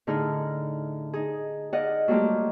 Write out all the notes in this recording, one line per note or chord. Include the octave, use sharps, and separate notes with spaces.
A2 D3 D#4 E4 G#4 F6
D#4 G#4
G#4 D5 D#5 F5 F#5
F#3 G3 A3 A#3 F4 G4